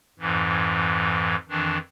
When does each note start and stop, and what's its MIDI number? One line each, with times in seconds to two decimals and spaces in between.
0.19 1.35 41
0.19 1.35 44
0.19 1.35 52
1.49 1.78 41
1.49 1.78 51
1.49 1.78 52
1.49 1.78 62